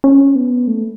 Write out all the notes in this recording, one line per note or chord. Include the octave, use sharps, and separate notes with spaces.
C#4
B3
A3